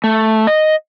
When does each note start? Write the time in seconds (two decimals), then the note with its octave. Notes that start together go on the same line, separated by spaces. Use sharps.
0.04 A3
0.47 D#5